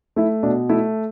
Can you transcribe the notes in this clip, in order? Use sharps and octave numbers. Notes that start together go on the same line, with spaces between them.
A3 E4
B2 D4
A3 E4